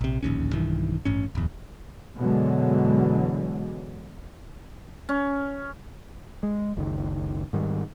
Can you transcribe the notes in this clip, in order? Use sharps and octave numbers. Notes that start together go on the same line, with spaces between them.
A#1 C3
D1 A#1 D#2 C#4
B1 G2 D#3 E3
A1 G2 C#4
D1 E2
F#2 B2 D3 E3 F#3 G#3
C#4
G#3
F#1 C#2 D#3
G#2 D#3 G3